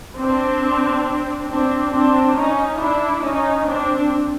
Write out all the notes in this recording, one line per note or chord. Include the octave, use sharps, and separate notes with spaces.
C4 D4
C4 D4
C4 D4
C#4 D#4
D4 E4
C#4 D#4
C4 D4